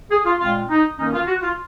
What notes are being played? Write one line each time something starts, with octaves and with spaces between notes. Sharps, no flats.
G#4
F4
A#2 G#3 C4 F4
D#4
D#3 A#3 C#4 D#4
F4
F#4
F4